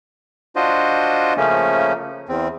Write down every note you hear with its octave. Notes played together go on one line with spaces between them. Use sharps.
D4 F4 F#4 C5 D#5
C#3 F3 A3 A#3 C#4
E2 C4